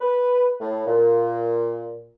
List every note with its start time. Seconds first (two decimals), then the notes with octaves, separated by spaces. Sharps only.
0.01 B4
0.61 A2
0.86 A#2